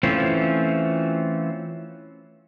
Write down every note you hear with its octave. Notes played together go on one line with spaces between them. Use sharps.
E3 A3 C4 C#4 F4